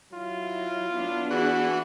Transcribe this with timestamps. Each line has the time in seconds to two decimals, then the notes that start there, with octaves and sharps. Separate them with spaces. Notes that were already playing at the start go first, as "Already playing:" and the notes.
0.14 F#3 E4 F4
0.91 B3 D4
1.31 E3 F#4 G#4